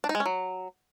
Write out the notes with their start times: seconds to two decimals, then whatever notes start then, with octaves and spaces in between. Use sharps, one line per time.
0.04 D4
0.09 D#4
0.15 G#3
0.20 C#4
0.26 F#3